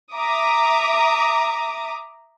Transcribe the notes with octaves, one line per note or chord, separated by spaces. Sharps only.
E5 A#5 D6 D#6